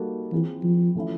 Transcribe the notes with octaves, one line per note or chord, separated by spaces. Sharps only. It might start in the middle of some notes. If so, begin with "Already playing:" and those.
Already playing: G3 A#3 D#4 F#4 A4
E3 C4 F4 G#4
F3
E3 A3 C#4 E4